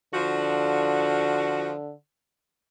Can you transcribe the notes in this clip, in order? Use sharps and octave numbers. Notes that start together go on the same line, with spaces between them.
D3 F3 F#4